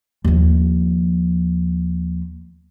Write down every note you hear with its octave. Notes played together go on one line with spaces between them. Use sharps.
D#2 F3